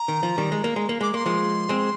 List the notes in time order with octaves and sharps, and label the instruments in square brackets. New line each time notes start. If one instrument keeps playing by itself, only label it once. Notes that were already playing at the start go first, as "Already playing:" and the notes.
Already playing: [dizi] A#5
[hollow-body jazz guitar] D#3
F3
D#3 G3
G#3
A#3
G#3
A#3
[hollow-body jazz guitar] G#3 [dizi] D6
[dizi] D6
[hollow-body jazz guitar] A#3 [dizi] C6
[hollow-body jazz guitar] F3 G#3
G#3 C4